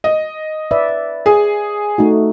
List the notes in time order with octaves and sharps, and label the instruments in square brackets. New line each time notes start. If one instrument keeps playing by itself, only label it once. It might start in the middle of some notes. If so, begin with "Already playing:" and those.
[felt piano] D#5
[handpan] B4 D5 E5
[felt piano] G#4
[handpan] A3 D#4 F#4